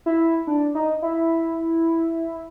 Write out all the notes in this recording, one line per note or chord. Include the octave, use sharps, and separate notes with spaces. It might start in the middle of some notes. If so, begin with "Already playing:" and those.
E4
D4
D#4
E4